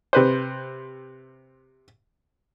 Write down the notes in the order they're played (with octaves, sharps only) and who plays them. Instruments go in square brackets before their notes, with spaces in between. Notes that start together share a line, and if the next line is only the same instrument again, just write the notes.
[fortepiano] C3 B4 C5